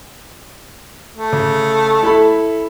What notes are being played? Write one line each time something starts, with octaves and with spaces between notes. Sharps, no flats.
A3
C#3
E4 A4 B5